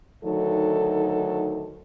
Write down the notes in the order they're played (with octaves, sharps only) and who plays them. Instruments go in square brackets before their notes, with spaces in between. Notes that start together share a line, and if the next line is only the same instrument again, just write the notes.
[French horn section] D2 D#3 F#3 D#4 A4